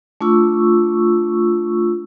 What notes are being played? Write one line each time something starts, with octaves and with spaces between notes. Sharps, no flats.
A3 D4 F4 C#6 E6